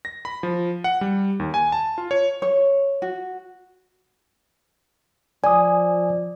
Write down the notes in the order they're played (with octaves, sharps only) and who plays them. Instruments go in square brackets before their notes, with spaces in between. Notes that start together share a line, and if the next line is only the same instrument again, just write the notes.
[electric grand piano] A#6
B5
F3
F#5
G3
D#2
G#5
A5
F4
C#5
[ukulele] C#5
F#4
[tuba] F3 [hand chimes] D5 [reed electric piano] G#5 D#6